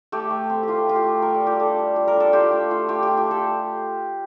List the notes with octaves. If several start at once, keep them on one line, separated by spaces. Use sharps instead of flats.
A3 G4
A3
C4
A3 F4 G4
A3 F4
G4
A3
G3 A#4
A4
F4 G4
D4 A4
G3
G3
A#4
D4 A4
F4 G4
A3
F4
A3 G4
F4 G4
G4
A3 A4